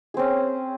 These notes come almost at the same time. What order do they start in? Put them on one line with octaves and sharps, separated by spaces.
G#4 C4 C#4